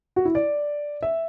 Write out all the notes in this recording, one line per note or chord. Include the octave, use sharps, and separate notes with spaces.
F#4
E4
D5
E5